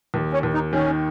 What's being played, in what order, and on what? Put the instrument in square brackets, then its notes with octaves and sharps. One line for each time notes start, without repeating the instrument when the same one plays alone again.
[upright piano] D#2
[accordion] C#4
[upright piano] D#2
[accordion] D#4
[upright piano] D#3 [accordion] C#4